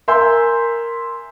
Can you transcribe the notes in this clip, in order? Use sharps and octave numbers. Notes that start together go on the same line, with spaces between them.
A#4 E5 G#5 C6 E6 G6